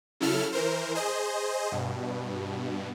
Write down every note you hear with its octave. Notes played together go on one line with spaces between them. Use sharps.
C#3 F#3 E4 A4 F6
E3 A#4 C5
G#4 C5 D#5
G2 B2